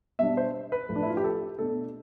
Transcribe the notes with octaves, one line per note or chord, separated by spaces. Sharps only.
B2 G3 D4 E5
C5
B4
A2 F3 A3
D4
E4
F4
G4
A4
B2 A3 D4 A4